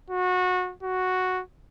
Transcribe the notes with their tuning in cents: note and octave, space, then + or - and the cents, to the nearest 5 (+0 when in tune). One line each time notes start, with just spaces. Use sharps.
F#4 -25
F#4 -5